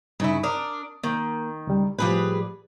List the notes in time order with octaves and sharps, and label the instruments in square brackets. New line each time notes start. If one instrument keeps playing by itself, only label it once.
[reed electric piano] G2 D#4 B5 [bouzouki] C#3 E4
[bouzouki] D4 A#4 [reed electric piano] D#6
[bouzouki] D#3 [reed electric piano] A#3
[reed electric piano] C#2 G3
[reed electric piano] A2 F3 [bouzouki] G3 G#4 B4